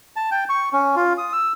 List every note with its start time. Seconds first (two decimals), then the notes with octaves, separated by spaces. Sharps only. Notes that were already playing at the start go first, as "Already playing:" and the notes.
0.16 A5
0.31 G5
0.49 C#6
0.73 C#4
0.96 F4
1.18 D#6
1.33 E6